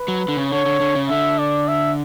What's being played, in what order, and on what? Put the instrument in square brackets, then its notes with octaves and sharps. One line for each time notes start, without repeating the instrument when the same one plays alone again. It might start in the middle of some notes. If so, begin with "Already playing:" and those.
Already playing: [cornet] B4
[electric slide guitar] F#3
D3
C#3
[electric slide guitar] D3 [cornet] C#5
[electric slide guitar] D3
D3
C#3
[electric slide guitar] D3 [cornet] E5
[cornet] D5
E5